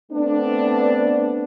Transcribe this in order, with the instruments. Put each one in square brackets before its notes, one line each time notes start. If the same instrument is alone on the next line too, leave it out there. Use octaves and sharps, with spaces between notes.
[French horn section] A3 B3 C4 D4